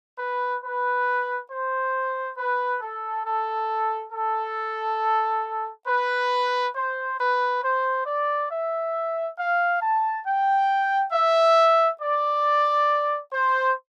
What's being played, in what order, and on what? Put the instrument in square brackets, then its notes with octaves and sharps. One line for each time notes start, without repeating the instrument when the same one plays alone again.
[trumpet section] B4
B4
C5
B4
A4
A4
A4
B4
C5
B4
C5
D5
E5
F5
A5
G5
E5
D5
C5